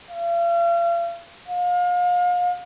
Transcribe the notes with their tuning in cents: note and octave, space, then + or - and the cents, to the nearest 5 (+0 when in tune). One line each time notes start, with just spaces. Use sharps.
F5 -40
F5 +35